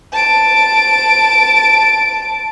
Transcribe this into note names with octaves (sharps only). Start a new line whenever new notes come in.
A5 D7